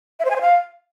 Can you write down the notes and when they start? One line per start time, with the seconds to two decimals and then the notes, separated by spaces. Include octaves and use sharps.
0.19 E5
0.25 C5
0.30 G#5
0.36 C5
0.41 F5